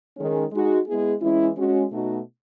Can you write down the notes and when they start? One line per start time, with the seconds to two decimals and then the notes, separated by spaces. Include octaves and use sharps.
0.17 D#3 G#3 C#4
0.51 G#3 D#4 F#4
0.87 G#3 B3 E4 G#4
1.21 E3 G#3 C#4 E4
1.56 G#3 C#4 F#4
1.91 B2 A3 D#4 F#4